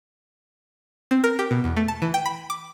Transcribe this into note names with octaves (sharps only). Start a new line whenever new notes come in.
C4
A#4
G4
B2
E2
A3
A5
E3
G5
B5
D6